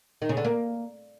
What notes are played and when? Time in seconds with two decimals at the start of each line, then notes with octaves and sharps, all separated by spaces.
0.22 D#3
0.29 C#3
0.37 D3
0.45 A#3